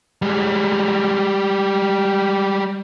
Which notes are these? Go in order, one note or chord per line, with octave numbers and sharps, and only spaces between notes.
G3 G#3